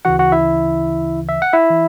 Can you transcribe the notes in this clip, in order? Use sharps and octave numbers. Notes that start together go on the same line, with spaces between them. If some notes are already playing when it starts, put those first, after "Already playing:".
D2 C#3 E3 F#4 F#5
F#4 F#5
E4 E5
E5
F#5
E4 E5
E3